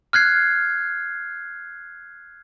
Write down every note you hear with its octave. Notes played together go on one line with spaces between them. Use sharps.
F6 F#6 G#6 C7